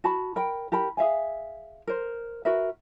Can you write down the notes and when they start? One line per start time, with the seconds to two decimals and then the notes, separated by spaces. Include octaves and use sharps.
0.04 F#4 A5 B5
0.36 A#4 G5 B5
0.72 G4 A#4 A5 B5
0.97 G#4 E5 F5 G#5
1.87 A#4 C5
2.45 F#4 A#4 B4 E5